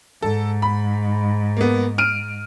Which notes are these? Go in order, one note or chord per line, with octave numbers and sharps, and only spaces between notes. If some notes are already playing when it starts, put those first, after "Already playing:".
G#2 A4
B5
A#3 B3
F6 D7 D#7